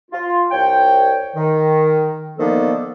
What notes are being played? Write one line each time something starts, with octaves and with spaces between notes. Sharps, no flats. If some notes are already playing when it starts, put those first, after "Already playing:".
F4
C2 C#5 G5
D#3
D3 D#3 F3 A#3 B3 A4